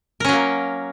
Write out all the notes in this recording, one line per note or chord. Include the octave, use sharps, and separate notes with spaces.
F#3 A#3 C#4 A#4